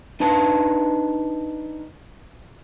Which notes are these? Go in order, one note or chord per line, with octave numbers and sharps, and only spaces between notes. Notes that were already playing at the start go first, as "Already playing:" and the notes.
D4 D#4 B4 A5